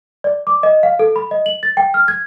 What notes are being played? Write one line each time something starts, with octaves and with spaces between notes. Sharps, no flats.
D5
D6
D#5
F5
A4
B5
D#5
F#7
A6
G5
F6
G#6